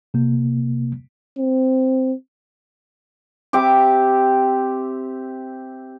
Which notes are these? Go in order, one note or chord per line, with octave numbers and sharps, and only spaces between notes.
C3 A#3
C4
C4 G4 E5 D6